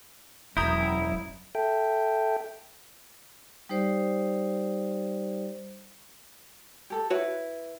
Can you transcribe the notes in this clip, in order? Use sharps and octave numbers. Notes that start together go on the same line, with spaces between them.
E1 F#2 E4 A#5 D#6 G6
A4 E5 G5
G3 D#4 G4 C5 D5
G4 A4
E4 F#4 B4 C#5